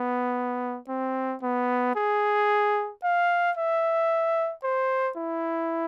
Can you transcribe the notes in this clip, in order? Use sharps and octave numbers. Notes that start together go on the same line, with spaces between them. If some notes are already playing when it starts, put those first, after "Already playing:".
Already playing: B3
C4
B3
G#4
F5
E5
C5
E4